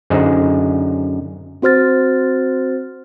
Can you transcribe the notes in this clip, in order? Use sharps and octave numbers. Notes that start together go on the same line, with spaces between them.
F#2 D3 D#4 G#4 C5
C4 F#4 C5 F6 A6